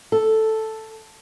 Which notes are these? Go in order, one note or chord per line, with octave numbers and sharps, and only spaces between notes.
A4